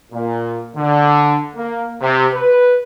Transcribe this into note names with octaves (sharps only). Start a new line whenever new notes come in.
A#2
D3
A#3
C3
B4